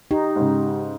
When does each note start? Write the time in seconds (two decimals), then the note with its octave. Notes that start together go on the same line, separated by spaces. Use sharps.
0.11 D#4 G4
0.36 G#2 C#3